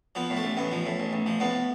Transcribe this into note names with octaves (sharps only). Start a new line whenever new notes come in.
F3 B3
A2
A3
A1
A1 B3
F3
A2
A1
A1
F3
A2 B3